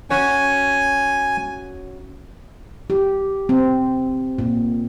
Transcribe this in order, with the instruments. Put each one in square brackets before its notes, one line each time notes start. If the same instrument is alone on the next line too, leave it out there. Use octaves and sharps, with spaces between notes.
[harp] C#4 F#4 C#5 [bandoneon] G#5
[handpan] G4
C4
A#2